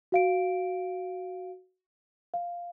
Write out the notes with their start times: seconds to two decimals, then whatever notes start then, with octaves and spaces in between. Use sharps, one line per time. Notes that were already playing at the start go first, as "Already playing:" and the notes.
0.12 F#4 F5 D7
2.34 F5